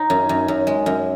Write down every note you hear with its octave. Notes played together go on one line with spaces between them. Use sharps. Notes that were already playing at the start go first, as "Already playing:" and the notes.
Already playing: D#4
F#2
F#2
F#2
G#3
F#2